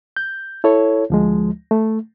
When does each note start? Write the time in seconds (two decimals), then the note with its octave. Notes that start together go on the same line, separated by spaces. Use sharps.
0.17 G6
0.64 E4 A4 C#5
1.10 D2 F3 G#3
1.71 A3